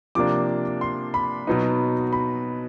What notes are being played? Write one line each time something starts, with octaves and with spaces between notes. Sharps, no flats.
C3 F3 A#3 D4 D6
C6
B5
B2 F#3 B3 D#4
B5